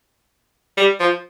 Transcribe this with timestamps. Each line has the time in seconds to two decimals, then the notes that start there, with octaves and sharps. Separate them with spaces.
0.77 G3
1.00 F3